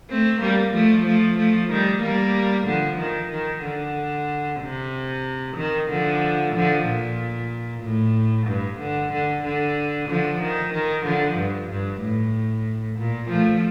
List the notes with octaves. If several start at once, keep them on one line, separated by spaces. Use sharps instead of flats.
A3 C4
G3 A#3
F3 A3
F3 A3
F3 A3
D#3 G3
G3 A#3
D3 F3
D#3
D#3
D3
C3
D#3
D3 F3
D3 F3
A#2
A2
G2
D3
D3
D3
D3 F3
D#3
D#3
D3 F3
G2
G2
A2
A#2
F3 A3